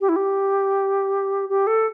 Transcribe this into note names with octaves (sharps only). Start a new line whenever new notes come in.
G4
E4
G4
G4
A4